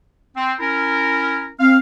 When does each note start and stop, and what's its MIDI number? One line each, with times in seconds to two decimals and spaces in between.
0.36 0.53 60
0.60 1.50 61
0.60 1.50 64
0.60 1.50 70
1.60 1.78 60
1.60 1.77 77